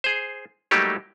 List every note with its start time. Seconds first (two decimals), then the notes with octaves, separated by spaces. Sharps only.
0.04 G#4 C5
0.71 F#3 G3 A3 A#3 D#4 G4